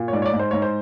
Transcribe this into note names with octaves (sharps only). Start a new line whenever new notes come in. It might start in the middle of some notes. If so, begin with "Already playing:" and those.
Already playing: A#2
C#5
G#2 D5
C#5
D5
G#2
C5
G#2 C#5
C5